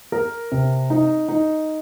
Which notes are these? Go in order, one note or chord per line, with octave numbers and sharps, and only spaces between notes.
A#4
C3
D#4
D#4